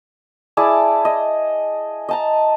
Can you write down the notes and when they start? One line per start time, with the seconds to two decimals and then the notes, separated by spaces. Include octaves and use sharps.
0.57 E4 G#4 D5 A5
1.05 D#5
2.09 D#5 A5 A#5